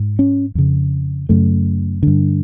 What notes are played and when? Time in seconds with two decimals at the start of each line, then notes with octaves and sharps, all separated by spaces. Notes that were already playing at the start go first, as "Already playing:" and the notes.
Already playing: G#2
0.19 C#4
0.55 F2 C#3
1.29 F#2 C#3 A3
2.03 G2 D3